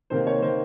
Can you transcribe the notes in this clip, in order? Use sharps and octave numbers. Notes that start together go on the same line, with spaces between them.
C3 D#3 A#3 C5
C#5
D#3 A#3 C5